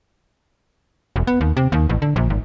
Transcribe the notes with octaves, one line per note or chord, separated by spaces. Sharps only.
E1
B3
D#2
C3
D#2
A1
D3
A#1
G#1